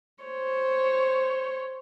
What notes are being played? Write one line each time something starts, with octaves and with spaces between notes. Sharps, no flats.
C5 C#5